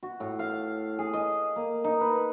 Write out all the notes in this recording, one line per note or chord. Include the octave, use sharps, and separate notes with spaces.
F#4
A2
F5
G#4
D#5
A#3
D#4
B4